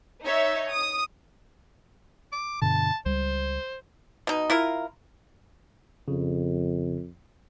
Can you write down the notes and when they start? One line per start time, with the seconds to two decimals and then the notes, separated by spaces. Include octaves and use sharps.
0.23 D#4 C#5 E5
0.70 D#6
2.32 D6
2.62 G2 B2 D3 A5
3.06 C#2 G3 C5
4.27 B2 D#4
4.50 E4 F4 A#4
6.08 F2 C#3